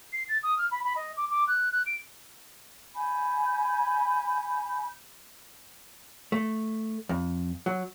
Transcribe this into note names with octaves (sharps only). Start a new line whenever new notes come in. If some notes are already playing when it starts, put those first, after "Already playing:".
C7
A6
D#6
F6
B5
B5
D#5
D6
D6
F#6
F#6
D7
G#5 B5 G6
A3
F2
F#3